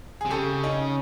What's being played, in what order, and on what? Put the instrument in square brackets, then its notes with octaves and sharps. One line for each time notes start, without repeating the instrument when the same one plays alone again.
[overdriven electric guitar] C3 [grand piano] G#4
[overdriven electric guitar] C#3 [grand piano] G4 A4
[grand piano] C#4 D#4